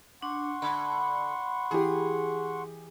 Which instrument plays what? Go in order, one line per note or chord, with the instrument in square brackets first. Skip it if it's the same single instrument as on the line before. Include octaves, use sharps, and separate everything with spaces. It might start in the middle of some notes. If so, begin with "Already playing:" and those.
[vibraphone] D4 [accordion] F#5 C6 C#6
[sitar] D3 [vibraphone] B5
[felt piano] E3 G4 [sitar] G#4